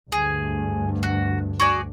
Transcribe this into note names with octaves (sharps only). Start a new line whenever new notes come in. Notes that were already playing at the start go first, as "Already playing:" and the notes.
D2 G2 G#4
F#4
F#4 G#4 D5